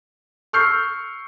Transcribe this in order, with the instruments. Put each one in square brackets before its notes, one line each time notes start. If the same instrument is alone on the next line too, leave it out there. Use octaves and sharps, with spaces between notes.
[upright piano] C#6 E6 F6 G6 C7